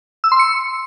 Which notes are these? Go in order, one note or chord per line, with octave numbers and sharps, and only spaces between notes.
E6
C6
C#7